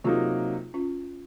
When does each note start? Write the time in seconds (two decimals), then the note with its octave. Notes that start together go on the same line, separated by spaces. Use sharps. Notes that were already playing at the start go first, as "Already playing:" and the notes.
0.04 C3 F#3 A#3 D#4 F4 G#4
0.74 C#4 F4